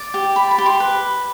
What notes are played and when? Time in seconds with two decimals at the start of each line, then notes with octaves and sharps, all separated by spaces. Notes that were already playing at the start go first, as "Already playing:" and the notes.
Already playing: D5
0.14 G4
0.36 D5 B5
0.51 B5
0.58 G4
0.66 C6
0.80 B4